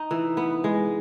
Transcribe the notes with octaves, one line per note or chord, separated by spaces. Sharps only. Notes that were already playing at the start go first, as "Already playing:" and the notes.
Already playing: D#4
E3
B3
G#3